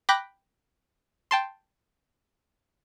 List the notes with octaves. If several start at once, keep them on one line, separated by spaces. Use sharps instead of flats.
G5 B5 D6 F#6 A#6
G5 A5 C6